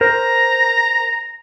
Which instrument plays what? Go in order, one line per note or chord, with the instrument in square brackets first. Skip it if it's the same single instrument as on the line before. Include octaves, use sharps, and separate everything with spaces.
[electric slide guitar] A#4 C5 [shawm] A#5